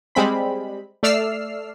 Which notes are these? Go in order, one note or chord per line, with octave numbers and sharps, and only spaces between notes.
G3 G#3 C4 B5
A3 D5 E6 F6 C7